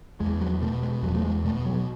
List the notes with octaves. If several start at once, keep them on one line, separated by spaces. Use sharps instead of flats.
E2 G#3
F#3
B2 A3
G#3
E2 F#3
A3
G#3
B2 A3
F#3